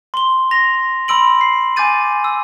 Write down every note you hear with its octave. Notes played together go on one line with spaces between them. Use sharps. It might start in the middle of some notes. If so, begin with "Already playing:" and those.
C6 G7
A#6 F7
B5 C6 E6 D7 F#7
C7
G#5 D6 G6 A6 D#7
E6